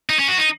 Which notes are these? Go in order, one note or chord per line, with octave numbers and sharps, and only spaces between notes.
D#4
C#4
F#4
D#4